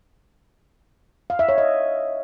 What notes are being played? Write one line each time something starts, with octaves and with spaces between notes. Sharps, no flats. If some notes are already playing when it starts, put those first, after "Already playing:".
F5
E5
C#5
D#5